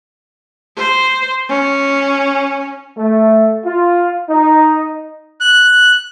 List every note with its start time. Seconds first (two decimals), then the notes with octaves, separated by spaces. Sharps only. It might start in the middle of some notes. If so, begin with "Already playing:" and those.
0.77 C5
1.49 C#4
2.98 A3
3.66 F4
4.30 D#4
5.41 F#6